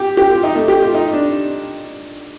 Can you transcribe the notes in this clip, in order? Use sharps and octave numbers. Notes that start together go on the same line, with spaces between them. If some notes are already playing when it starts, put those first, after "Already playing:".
Already playing: G4
G4
F4
D#4
A3
G4
F4
D#4
D4